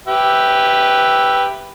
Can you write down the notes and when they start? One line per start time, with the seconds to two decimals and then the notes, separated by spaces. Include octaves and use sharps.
0.07 G4 B4 E5